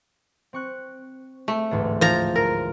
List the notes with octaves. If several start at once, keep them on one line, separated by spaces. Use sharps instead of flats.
C4 C#6 F#6
A3
A1 D2 G#2
F3 A#5
A#4